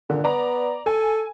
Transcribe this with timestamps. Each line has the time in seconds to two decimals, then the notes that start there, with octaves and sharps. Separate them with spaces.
0.10 A#2 D3
0.24 B3 D5 A#5
0.86 A4 G#5